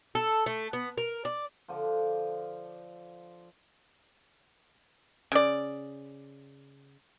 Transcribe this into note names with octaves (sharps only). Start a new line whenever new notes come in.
A4
A3
B3
A#4
D5
D3 F3
C#3 D5